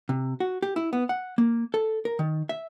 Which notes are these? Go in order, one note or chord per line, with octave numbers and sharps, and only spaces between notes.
C3
F#4
G4
E4
B3
F#5
A#3
A4
A#4
D#3
E5